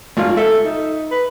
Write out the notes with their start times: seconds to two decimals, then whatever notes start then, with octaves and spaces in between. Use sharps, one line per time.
0.17 G#1 F4
0.37 A4 E5
0.65 D#4
1.11 B4